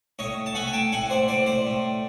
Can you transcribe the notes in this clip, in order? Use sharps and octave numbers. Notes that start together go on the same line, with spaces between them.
A2 C#5 D#5
A5
A3 F#5 G#5
G#5
G5 A5
A2 F#5 G#5
C5 D5
A2 C5 D5
C5 D5
A2